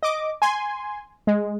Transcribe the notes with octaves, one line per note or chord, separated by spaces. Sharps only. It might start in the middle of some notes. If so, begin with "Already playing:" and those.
D#5 D6
G#5 C6
G#3